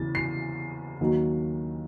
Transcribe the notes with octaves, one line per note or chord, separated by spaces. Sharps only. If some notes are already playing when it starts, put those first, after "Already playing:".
Already playing: E2 C#3 E3 A6
C7
D#2 D#3 F#3